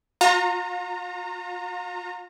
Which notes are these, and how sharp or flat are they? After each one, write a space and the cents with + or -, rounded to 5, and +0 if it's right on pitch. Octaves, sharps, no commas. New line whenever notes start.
F4 +40 A#5 -20